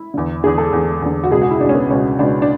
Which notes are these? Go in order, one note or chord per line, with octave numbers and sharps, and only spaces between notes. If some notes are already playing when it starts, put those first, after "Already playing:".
Already playing: E4
E2 D3
E2 D3 G#4
A4
E2 D3
E2 D3
F#4
C#2 B2 G#4
F#4
E4
C#2 B2 D4
C#4
B3
C#2 B2 C#4
C#2 B2 D4
D4